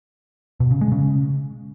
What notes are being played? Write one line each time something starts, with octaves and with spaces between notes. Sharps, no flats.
B2
C#3
G#3
C#3